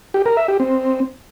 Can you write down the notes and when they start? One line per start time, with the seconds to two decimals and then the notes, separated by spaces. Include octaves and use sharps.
0.14 G4
0.26 A#4
0.37 E5
0.48 G4
0.60 C4